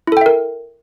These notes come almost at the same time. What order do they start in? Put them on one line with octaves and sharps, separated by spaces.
E4 A4 G5 E5 A#4